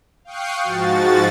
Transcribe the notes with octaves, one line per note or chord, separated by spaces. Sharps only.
F5 G5 C#6 D#6 F#6 C7
G#2 F3 F#4 A6